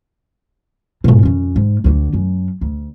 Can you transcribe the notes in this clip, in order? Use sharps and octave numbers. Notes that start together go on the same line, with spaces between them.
G#2 B2
F2 C#4
G#2
D2 D3
F#2
D2